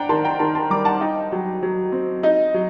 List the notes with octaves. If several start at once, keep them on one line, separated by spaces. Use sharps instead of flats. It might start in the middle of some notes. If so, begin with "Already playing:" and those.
Already playing: D4 F#5 G5 A#5
D#3 A5 C6
G5 A#5
D#3 A5 C6
A5 C6
G3 A#5 D6
F#5 A5
D#4 D#5 G5
F#3
F#3
C4
D#4 D#5
F#3